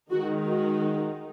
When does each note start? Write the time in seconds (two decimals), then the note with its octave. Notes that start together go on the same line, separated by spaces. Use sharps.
0.11 D#3 G#3 D#4 F#4
0.47 F#4